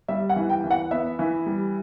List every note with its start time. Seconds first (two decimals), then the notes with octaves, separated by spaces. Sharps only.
0.08 G3 E5
0.29 F#5
0.36 E3
0.49 G5
0.64 E3
0.71 F#5
0.91 B3 E5
1.19 E3
1.46 G3